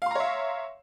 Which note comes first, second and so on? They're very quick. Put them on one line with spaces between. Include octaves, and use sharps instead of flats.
F5 C6 A#5 C#5 E5